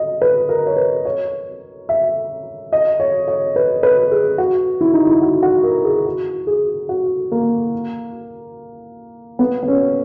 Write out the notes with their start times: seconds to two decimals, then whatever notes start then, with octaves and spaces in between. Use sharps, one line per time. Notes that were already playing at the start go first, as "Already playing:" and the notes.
Already playing: D#5
0.22 B4
0.49 A#4
0.67 C#5
0.77 B4
1.05 C#5
1.89 E5
2.72 D#5
3.00 C#5
3.28 C#5
3.56 B4
3.83 B4
4.11 G#4
4.38 F#4
4.81 E4
4.94 D#4
5.07 E4
5.22 F#4
5.43 F#4
5.63 A#4
5.85 G#4
6.06 F#4
6.47 G#4
6.89 F#4
7.32 A#3
9.39 B3
9.63 B3
9.68 C#4